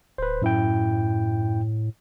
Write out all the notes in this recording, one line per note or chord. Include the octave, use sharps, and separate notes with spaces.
D1 B4 C5
F#2 A2 E4 G5